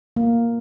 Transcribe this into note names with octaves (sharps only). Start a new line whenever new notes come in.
A#3